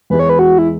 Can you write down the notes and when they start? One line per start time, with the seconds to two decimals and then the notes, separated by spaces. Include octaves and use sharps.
0.10 E2 E3 G#3 B4
0.20 C#5
0.29 B4
0.39 F#4
0.58 E4